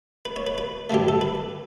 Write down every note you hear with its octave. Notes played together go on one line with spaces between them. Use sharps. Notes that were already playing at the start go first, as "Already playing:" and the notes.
B4
C#5
B4
B4
G2 D3 F#3 A3 G4
A4
B4